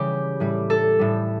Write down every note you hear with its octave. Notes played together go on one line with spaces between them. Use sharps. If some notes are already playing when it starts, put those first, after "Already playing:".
Already playing: C#3 E3 G3 G4
A2 G3
A4
A2 G3